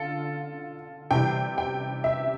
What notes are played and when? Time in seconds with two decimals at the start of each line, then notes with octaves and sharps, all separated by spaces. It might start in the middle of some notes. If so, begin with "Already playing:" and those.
Already playing: D3 F4 A4
1.11 C3 E3 G3 G5
1.58 G5
2.04 E5